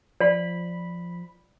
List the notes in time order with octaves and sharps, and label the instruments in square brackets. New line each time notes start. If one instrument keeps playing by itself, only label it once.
[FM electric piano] F3 B5 [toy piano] D5